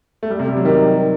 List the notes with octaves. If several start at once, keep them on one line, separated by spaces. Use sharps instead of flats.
A3
G3
C3
G3
F#3
D#3 G3